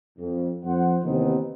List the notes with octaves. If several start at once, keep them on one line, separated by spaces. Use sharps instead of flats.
F2
F2 C5 F#5
D#2 C3 E3 B3 C4 D#4